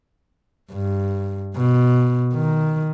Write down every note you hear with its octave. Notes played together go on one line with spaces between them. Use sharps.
G2
B2
D#3